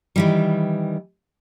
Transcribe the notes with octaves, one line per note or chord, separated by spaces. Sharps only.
D#3 E3 G3